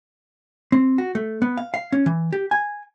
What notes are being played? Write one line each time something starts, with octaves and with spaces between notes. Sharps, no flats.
C4
F#4
A3
B3
F5
F5
C#4
E3
G4
G#5